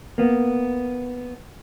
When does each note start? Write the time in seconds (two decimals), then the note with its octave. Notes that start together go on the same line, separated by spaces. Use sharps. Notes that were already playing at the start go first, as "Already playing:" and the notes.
0.18 A#3 B3